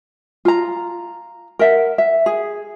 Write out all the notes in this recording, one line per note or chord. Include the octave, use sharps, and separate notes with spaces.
F4 A#5
A#4 E5 F#5
E5
G#4